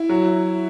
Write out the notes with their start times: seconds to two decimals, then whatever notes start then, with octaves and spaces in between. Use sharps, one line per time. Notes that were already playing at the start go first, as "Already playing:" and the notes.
Already playing: E4
0.09 F#3